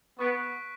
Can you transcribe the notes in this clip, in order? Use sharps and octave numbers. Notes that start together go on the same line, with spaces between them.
B3 C#6 F#6 B6 D7